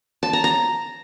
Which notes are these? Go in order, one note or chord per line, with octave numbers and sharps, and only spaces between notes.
A5
A#5
A#5